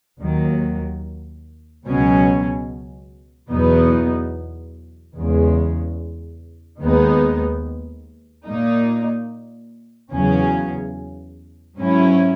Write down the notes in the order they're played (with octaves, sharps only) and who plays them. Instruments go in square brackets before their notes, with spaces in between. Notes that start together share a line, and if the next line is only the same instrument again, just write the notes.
[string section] D#2 D#3 F#3
C#2 B2 F#3 C#4
E2 B2 F#3 B3 D#4
E2 C#3 G#3
D#2 D#3 G#3 B3 D#4
A#2 A#3 D#4
E2 C#3 F#3 C#4
G#2 F#3 C#4 E4